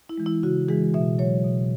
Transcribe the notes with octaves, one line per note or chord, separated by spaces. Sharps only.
E4
E3 G#3
E4
C#3 F#4
E3 G#3 G#4
B2 E5
F#3 C#5
B2